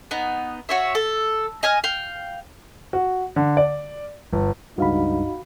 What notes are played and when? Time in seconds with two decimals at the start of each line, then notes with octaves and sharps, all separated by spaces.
0.11 B3 D#4
0.69 F#4 C#5 E5
0.95 A4
1.63 D#5 G#5 F6
1.84 F5 G5
2.93 F#4
3.36 D3
3.57 D5
4.33 G1
4.78 C#2 G2 D#4 F#4 F5 B5